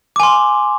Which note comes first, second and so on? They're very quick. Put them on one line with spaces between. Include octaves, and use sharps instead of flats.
D6 G#5 C6